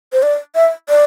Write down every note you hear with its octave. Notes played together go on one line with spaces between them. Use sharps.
C5
D5
E5
D5